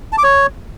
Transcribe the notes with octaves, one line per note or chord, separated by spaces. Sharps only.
A5
D6
C#5